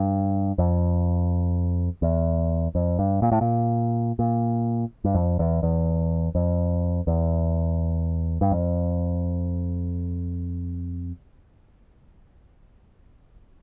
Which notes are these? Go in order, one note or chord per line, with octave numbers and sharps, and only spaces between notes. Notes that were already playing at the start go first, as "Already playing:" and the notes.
Already playing: G2
F2
E2
F2
G2
A#2
A2
A#2
A#2
G2
F2
E2
E2
F2
E2
G2
F2